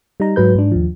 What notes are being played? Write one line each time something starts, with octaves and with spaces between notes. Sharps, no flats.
G3 D#4 A#5
G#2 F#3 B4 G6
G#2 D4
D#2 F3